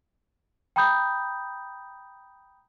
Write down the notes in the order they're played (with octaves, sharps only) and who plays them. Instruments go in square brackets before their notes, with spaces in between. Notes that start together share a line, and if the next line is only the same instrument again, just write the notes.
[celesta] G5 A#5 B5 D#6 G6